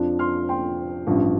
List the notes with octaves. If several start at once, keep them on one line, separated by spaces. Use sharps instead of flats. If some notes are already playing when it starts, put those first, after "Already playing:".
Already playing: F2 F3 D4
C6 F6
G5 C6
A1 G2 F3